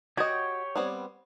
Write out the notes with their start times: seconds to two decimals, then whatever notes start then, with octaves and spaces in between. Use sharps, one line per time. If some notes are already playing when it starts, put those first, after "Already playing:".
0.17 F#4 G4 C#5 D#5 G5
0.76 G3 B3 C4